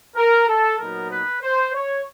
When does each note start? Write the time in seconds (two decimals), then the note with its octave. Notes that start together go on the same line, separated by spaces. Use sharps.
0.16 A#4
0.48 A4
0.79 A#2 F#3 B3 D#4 A#4
1.11 B4
1.42 C5
1.74 C#5